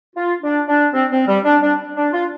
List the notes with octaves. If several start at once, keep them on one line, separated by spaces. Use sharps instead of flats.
F4
D4
D4
C4
C4
G3
D4
D4
D4
F4